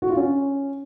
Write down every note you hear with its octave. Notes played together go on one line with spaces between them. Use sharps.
F#4
F4
C#4